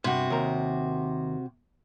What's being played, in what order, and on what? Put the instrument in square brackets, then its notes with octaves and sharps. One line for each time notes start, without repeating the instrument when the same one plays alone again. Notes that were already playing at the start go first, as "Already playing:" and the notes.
[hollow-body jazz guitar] G2 [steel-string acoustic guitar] C3 F#4
[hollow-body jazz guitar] D#2 A#4